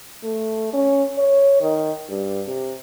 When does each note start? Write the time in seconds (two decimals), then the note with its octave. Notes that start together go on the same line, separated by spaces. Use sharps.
0.23 A3
0.73 C#4
1.18 C#5
1.61 D#3
2.09 G2
2.48 C3